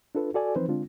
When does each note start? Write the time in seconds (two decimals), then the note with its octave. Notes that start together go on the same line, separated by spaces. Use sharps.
0.15 D4 F4 A4 B4
0.34 F#4 A4 D5 G#5
0.55 E3 F3 C4 D#4 B4 C5
0.68 D3 G#3 C4 D4 F4